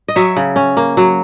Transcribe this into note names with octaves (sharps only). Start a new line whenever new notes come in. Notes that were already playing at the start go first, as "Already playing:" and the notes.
D#5
F#3 C#5 E5
C#3
C#4
A#3
F#3